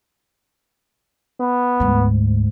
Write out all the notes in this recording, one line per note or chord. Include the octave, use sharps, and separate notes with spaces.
B3
D2 G#2